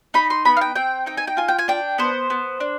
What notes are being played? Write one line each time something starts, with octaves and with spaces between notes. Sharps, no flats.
D#4 B5
C6
B3 B5
F5
G5
C4 G5
D#4 G5
G#5
G5
F4 G#5
G5
G#5
D4 G5
B3 C5
B3
D4